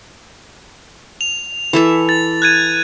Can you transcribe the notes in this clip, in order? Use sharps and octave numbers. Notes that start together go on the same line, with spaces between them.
F7
E3 A4 E5
A6
F#6 G#6 D#7